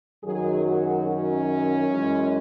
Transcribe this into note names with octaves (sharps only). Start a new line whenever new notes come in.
F#2 D#3 F#3 G#4
F#4
C#4
F#2 E3 G#3